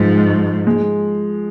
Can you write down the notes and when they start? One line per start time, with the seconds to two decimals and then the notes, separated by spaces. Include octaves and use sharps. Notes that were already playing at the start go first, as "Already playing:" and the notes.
Already playing: G#2 F3
0.67 G#3